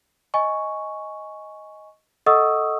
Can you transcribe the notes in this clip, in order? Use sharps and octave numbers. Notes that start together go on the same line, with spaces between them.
D#5 G#5 C#6
A4 D#5 F#5 C#6 D#6 E6